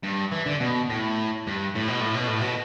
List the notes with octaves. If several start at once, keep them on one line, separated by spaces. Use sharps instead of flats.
G2
E3
D3
B2
A2
G2
A2
B2
A2
B2
A2
B2